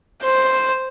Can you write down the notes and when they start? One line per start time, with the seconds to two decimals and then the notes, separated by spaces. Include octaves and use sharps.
0.23 C5